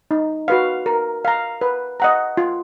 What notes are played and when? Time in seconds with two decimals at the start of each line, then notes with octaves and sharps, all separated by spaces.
0.11 D#4
0.48 F#4 B4 F5
0.86 A#4
1.25 F5 A#5
1.61 B4
2.00 D#5 F#5 A#5
2.37 F4